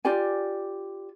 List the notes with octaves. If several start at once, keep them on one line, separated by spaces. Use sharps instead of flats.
F4 G4 D5 G#5